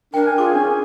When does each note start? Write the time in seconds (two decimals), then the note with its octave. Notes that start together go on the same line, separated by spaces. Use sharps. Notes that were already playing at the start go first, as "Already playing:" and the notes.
0.14 D4 A#4 G5
0.27 G#5
0.38 F4 G#4 D6
0.54 C#4 D4 G#5